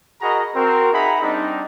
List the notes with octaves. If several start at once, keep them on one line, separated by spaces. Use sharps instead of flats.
F#4 G#4 A#4 D#5 A#5 B5
C4 F#4 A#4
D#4 G#4 E5 F#5 A#5 B5
G3 C4 D4 D#4